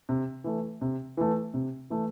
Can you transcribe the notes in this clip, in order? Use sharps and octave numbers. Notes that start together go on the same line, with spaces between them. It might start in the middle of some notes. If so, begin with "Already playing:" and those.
C3
E3 A3
C3
E3 A3
C3
E3 A3